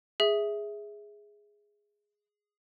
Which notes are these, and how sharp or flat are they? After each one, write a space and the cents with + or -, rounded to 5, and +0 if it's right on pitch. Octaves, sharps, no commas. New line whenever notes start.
G#4 -5 E5 -5